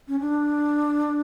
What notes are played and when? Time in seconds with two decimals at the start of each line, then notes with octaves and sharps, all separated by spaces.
0.08 C#4
0.20 D4